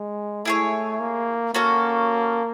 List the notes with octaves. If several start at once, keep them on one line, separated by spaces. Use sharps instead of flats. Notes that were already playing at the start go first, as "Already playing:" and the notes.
Already playing: G#3
A3 E4 G#4 C#5
A#3
A#3 C#4 F#4 A4